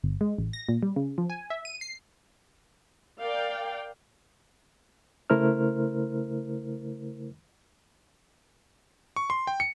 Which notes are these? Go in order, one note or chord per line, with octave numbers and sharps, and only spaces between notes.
G1
G#3
A1
A#6
A#2
G3
C#3
F3
G#5
E5
D#7
C7
A#4 D5 F5 G5
C#3 A3 E4 A#4 C5 F6
C#6
C6
G5
C#7